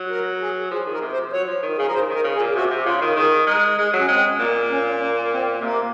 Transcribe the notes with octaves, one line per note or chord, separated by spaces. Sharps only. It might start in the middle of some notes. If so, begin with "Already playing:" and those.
Already playing: F#3
A#4
G#4
F3 G#4
D#3
A#4
C3
C5
F3
F#3 C#5
F3
D#3
C#3 G#4
F3 A#4
D#3 C5
D#3
A#4
C#3
G#4
A#2
C3 F#4
C3
C#3 F4
D#3
D#3 G#4
G#3 A#4
G#3 G#4
F#3
C#4
G#3 C4
A#2 A#3
C#4
A#3
C4
C3 A#3